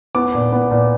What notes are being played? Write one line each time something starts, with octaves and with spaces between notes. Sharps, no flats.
B3 D6
A#2
B3
A#2